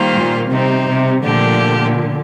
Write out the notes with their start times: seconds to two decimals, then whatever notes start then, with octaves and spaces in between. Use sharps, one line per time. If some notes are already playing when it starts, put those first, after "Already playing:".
Already playing: D#3 G3 A#3 F4 C5
0.15 A#2
0.51 C3 G3 C4 D#4
0.88 C3
1.24 A#2 D3 F3 A3 D4 G4